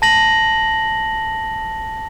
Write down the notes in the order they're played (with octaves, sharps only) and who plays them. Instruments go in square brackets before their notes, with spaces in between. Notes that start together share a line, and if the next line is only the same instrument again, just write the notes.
[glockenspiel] A5 A#6 F#7